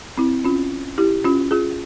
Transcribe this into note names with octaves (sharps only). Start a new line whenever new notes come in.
C4 E4
C#4 F4
E4 G4
C#4 F4
F4 G#4